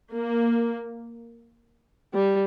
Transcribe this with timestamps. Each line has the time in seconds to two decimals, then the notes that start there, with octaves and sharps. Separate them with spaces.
0.12 A#3
2.12 G3